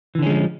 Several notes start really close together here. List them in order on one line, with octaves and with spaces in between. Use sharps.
E3 D3 C#4 G#3 F3